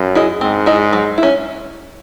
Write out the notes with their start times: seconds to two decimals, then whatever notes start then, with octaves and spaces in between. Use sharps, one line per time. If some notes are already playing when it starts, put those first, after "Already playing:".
Already playing: F#2
0.15 E4 G#4 D#5
0.41 G#2 C4
0.66 E4 G#4 D#5
0.93 F#3
1.18 E4
1.23 C#4